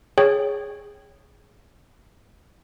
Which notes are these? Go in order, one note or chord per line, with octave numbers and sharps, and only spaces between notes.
G#4 C#5 G5